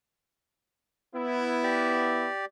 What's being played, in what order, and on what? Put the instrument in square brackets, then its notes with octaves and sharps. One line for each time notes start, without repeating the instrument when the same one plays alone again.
[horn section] B3 E4
[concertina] G4 D5